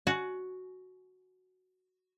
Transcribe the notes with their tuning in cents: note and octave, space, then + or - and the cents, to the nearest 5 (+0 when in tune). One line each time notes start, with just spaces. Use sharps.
F#4 +0 G#5 +25